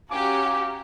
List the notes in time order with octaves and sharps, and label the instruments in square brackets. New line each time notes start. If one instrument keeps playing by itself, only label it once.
[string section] C#4 F#4 G4 [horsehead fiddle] F5 A#5 [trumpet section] G#5 D6